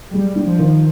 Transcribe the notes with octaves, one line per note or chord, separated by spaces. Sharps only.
G3 G#3
D4
F3
D#3